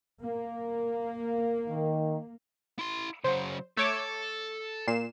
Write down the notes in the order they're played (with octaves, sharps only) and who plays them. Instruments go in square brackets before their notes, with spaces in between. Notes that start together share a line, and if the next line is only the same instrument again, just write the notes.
[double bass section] A#3
[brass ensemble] D#3
[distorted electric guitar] E4 C6
[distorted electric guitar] C#3 F#3 [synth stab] C5
[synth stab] A3 C#5 D6 [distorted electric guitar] A4
[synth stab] A#2 C7 E7